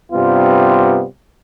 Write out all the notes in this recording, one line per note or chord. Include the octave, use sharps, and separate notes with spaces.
G2 C3 G3 B3 F4